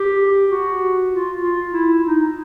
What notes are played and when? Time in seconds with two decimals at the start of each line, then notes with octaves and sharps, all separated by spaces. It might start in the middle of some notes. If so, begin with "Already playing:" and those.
Already playing: G4
0.50 F#4
1.11 F4
1.42 F4
1.73 E4
2.04 D#4